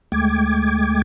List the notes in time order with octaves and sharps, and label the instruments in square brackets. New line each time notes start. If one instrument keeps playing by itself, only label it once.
[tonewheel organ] D2 G#3 A3 G5 D6 G#6